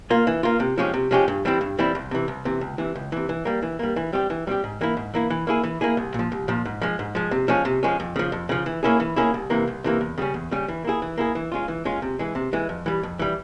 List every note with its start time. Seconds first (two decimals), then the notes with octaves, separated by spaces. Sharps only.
0.10 A#3 F4
0.27 E3
0.43 A#3 F4
0.60 C3
0.77 F3 G#3 C#4 G4
0.94 C3
1.11 F3 G#3 C#4 G4
1.28 G2
1.45 E3 G3 C4 E4
1.61 G2
1.78 E3 G3 C4 E4
1.95 C2
2.11 C3 E3
2.28 C2
2.45 C3 E3
2.61 C#2
2.78 C3 E3
2.95 C#2
3.12 C3 E3
3.29 E3
3.45 G3 A#3
3.62 E3
3.79 G3 A#3
3.96 E3
4.13 G3 C4 G4
4.30 E3
4.47 G3 C4 G4
4.64 G#2
4.81 E3 A#3 E4
4.97 G#2
5.14 E3 A#3 E4
5.30 E3
5.47 A#3 E4 G#4
5.64 E3
5.81 A#3 E4 G#4
5.97 C2
6.14 A#2 F3
6.32 C2
6.48 A#2 F3
6.65 G#2
6.82 F3 G#3
6.99 G#2
7.15 F3 G#3
7.31 C3
7.48 F3 G#3 C#4
7.65 C3
7.83 F3 G#3 C#4
8.00 F2
8.16 C#3 F3
8.32 F2
8.49 C#3 F3
8.66 E3
8.83 A#3 C#4 E4 G#4
9.00 E3
9.16 A#3 C#4 E4 G#4
9.34 C2
9.50 C3 E3 A#3
9.68 C2
9.84 C3 E3 A#3
10.01 E2
10.18 C#3 G3 C#4
10.34 E2
10.51 C#3 G3 C#4
10.68 E3
10.84 A#3 E4 G#4
11.02 E3
11.18 A#3 E4 G#4
11.35 E3
11.52 G#3 C#4 F4
11.68 E3
11.85 G#3 C#4 F4
12.02 C3
12.19 E3 G#3
12.35 C3
12.53 E3 G#3
12.69 F2
12.86 E3 G3
13.03 F2
13.19 E3 G3